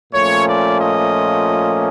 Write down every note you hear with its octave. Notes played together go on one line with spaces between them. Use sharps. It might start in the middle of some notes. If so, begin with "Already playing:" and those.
A#2 F3 A3 C#4 C#5
D5
D#5